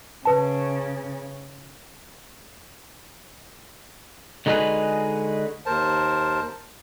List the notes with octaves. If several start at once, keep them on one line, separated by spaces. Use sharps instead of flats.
C#3 B4 A5
D3 G#3 D#4 F#4 G#4 B4
D#2 A#4 C5 A5